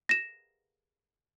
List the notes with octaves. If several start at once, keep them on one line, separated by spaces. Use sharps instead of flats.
A#6 E7